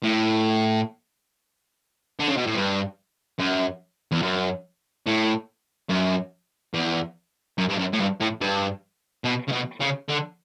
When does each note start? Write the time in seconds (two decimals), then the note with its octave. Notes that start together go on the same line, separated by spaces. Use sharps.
0.04 A2
2.19 D3
2.28 C#3
2.37 B2
2.47 A2
2.55 G2
3.39 F#2
4.12 E2
4.22 F#2
5.07 A2
5.89 F#2
6.74 E2
7.58 F#2
7.69 G2
7.78 F#2
7.93 A2
7.99 G2
8.20 A2
8.41 G2
9.25 B2
9.48 C#3
9.52 B2
9.81 C#3
10.09 D3